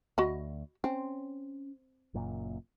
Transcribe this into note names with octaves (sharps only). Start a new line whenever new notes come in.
D2 F#4 D#5 B5
C4 C#4
F#1 F#2 A#2